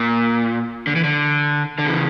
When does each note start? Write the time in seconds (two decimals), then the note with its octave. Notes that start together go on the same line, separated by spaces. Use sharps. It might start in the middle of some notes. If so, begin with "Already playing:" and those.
Already playing: A#2
0.87 D3
0.96 E3
1.04 D3
1.78 D3
1.86 C#3 E3